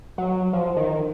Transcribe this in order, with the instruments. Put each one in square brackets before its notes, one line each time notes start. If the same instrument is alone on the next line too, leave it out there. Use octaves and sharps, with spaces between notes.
[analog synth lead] F#3
F3
D#3